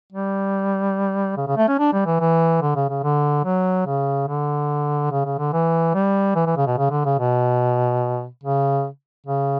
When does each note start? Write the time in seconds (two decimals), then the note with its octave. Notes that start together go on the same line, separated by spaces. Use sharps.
0.13 G3
1.37 C#3
1.47 C#3
1.57 A3
1.68 C#4
1.79 D4
1.93 G3
2.06 E3
2.20 E3
2.62 D3
2.76 C#3
2.90 C#3
3.03 D3
3.45 F#3
3.86 C#3
4.28 D3
5.11 C#3
5.25 C#3
5.38 D3
5.53 E3
5.95 G3
6.36 E3
6.46 E3
6.57 C#3
6.67 B2
6.78 C#3
6.91 D3
7.05 C#3
7.19 B2
8.43 C#3
9.27 C#3